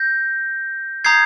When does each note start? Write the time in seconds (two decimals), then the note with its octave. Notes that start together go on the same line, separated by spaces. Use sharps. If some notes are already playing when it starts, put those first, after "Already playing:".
Already playing: G6 A#6
1.04 A#5 D#6 G6 G#6 C7